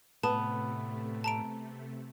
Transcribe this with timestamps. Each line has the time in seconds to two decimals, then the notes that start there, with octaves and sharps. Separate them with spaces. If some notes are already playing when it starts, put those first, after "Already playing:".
0.23 A2 C3 A3 B3 A5
1.24 A5 A#5 D7